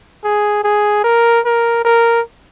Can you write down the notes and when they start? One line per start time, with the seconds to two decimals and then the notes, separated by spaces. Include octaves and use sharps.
0.24 G#4
0.64 G#4
1.04 A#4
1.45 A#4
1.85 A#4